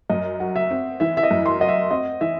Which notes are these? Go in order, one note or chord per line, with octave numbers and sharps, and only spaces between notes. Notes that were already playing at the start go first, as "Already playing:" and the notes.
F#2 D#5
F#4
E5
C4
E3 E5
E5
D#5
F#2
C6
F#4 D#5
E5
C4 D#5
E3 E5